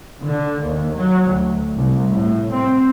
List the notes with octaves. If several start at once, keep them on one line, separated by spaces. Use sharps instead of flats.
D3
D#2
F#3
D2
C2
A2
C4